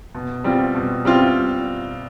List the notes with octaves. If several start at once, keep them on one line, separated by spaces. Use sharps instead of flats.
B2
G3 C4 F4
B2
G3 C4 F4